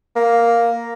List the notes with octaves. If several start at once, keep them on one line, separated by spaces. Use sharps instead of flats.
A#3